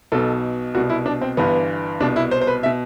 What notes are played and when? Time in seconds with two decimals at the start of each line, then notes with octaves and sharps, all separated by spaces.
0.12 B1 B2 A4
0.74 C2 B2 F#4
0.90 E4
1.06 D4
1.21 C4
1.37 G1 G2 E3 B3
2.00 C2 B2 D4
2.16 E4
2.31 C5
2.41 C5
2.47 B4
2.63 E5
2.66 B2